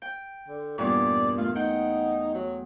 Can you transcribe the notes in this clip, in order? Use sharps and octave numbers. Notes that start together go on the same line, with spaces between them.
G5
D3
E2 G2 A#2 D5
A3 F4
D#4 F#5 G5
F#3